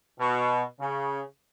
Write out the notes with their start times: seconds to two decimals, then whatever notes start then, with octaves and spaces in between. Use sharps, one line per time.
0.20 B2
0.80 C#3